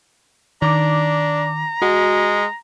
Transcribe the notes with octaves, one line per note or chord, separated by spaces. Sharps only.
D#3 D4 A#5 D6
G#3 F#4